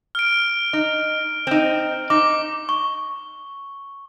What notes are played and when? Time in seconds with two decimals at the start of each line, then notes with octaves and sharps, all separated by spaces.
0.15 F6 D7
0.73 D#4
1.47 C4 D#4
2.10 D#4 D6
2.69 C#6